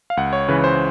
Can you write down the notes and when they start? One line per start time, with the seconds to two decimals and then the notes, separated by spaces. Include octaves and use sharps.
0.10 F5
0.17 C#2 F#5
0.33 C#5
0.49 C#3 E3 B4
0.64 C5